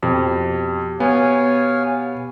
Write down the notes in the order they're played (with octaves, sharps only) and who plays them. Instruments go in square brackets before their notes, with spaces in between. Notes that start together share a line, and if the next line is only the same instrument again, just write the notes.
[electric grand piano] F2 [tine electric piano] B2 G4 D6
[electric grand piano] B3 [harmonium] C#5 F5 G#5